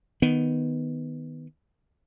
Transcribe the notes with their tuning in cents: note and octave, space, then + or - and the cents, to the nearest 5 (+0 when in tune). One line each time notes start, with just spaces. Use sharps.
D#3 +0 B3 +0